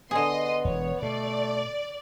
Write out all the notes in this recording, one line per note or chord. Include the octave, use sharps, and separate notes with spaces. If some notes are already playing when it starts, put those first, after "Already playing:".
D3 B3 G#4 D#5 C6
E1 E2 C#5
B2 A3 D5